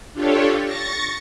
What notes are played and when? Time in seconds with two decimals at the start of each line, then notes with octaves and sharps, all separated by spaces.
0.14 D4 F4 G4 A4 C#5
0.64 C#6 A6 A#6 C#7